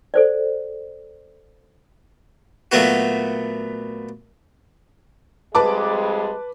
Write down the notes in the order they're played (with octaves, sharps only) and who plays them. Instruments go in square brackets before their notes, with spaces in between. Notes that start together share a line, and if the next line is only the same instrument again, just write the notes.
[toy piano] A4 C5 D5
[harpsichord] A#2 F#3 A3 B3 F#4
[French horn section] F2 G3 G#3 [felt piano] B4 A5 D6